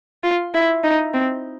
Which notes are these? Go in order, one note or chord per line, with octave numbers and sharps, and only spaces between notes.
F4
E4
D#4
C4